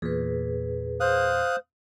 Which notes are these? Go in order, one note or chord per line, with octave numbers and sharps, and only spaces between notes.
E2 A#2 G#4 B4
C5 F5 D#6 F#6